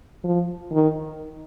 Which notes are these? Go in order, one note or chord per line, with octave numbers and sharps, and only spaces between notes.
F3
D#3